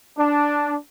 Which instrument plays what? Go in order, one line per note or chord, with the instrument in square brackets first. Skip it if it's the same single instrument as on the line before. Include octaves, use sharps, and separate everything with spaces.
[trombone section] D4